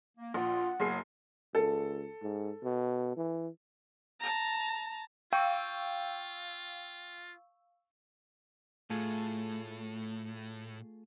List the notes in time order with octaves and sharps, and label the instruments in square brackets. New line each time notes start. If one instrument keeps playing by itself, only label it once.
[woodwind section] A#3
[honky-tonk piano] A#1 [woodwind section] F4 [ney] F#5
[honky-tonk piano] F#1 G#4 C7 [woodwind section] F#3
[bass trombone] C#2 [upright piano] A4
[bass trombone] G#2
B2
E3
[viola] A5 A#5
[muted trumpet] F4 [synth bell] F5 C#6 E6 [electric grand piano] G5
[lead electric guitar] A2 [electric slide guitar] A3 F4 G#4